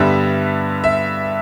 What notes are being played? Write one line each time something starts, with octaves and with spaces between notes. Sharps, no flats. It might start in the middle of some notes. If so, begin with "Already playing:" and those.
Already playing: G2 D3 G3 B3 E5
E5